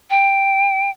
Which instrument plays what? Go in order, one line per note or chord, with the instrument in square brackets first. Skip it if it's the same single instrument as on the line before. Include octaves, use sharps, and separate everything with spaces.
[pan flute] G5